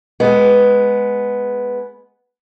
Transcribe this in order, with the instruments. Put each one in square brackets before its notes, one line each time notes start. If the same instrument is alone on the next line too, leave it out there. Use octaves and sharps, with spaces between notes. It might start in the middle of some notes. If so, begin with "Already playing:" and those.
[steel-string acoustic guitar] G#3 B3